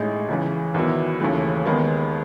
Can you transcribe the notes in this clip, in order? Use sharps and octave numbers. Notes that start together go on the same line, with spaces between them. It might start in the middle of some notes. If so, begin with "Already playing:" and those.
Already playing: A1 A2 G#3 D#4 G#4
C#2 C#3 E3
E2 D#3 F#3 B3 E4
D#2 C#3 E3 A3
D#2 D#3 G#3 B3